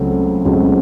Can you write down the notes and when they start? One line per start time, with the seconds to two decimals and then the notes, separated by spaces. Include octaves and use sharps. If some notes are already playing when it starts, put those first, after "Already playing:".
Already playing: C#2 C#3 F#3 A3 C4
0.45 C#2 C#3 F#3 A3 C4